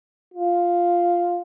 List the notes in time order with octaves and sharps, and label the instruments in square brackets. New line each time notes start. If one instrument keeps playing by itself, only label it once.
[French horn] F4